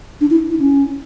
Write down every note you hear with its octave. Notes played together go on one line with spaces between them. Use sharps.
D4
E4
E4
C#4